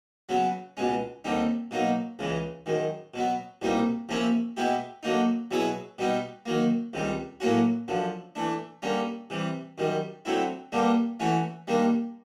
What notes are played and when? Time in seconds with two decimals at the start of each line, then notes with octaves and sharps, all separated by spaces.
0.29 C#3 F#3 B3
0.77 C#2 B2 G#3 C#4
1.24 D#2 D3 G3 C4 D#4
1.71 B2 F#3 A#3 D#4
2.19 C#2 C#3 E3 G#3
2.66 F#2 D#3 G#3
3.14 B2 F#3 B3
3.62 C2 B2 G3 A#3 D#4
4.09 C3 F3 A#3 C#4 E4
4.57 B2 G#3 B3 E4 G4
5.03 D3 F#3 A#3 D#4
5.51 B2 F#3 B3 E4 G#4
5.98 B2 G3 B3 D#4
6.46 D#3 F#3 A#3
6.93 C#2 C3 D#3 G3
7.40 A2 F#3 A#3 C#4 F#4
7.88 F#2 D3 F3
8.35 E3 A3 D4
8.82 D3 G3 A#3 C#4
9.30 C3 E3 G3
9.78 F#2 D#3 G3
10.25 D3 F#3 A3 C4 E4
10.72 G2 D3 G3 A#3 D4
11.20 E3 A3 C#4 F#4
11.67 D#3 G3 A#3 D4